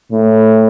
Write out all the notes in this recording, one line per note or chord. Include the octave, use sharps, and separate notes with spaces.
A2